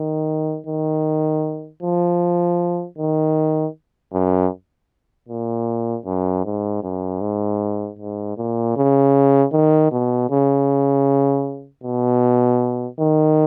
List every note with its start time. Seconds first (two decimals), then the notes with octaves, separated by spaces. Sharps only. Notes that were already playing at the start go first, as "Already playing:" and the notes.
Already playing: D#3
0.66 D#3
1.82 F3
2.98 D#3
4.13 F#2
5.28 A#2
6.06 F#2
6.44 G#2
6.83 F#2
7.21 G#2
7.99 G#2
8.37 A#2
8.76 C#3
9.52 D#3
9.92 B2
10.30 C#3
11.83 B2
13.00 D#3